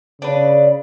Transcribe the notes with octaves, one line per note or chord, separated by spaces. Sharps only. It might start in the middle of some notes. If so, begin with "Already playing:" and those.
C#3 D4 B4